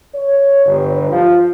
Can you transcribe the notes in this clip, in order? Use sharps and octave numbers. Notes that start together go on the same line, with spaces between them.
C#5
G1
F3